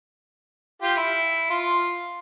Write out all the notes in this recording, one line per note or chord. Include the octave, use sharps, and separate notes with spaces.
F4 G4
E4
F4